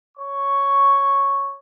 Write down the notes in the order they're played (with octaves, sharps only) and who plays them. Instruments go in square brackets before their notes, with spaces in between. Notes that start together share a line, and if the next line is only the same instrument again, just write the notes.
[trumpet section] C#5 C#6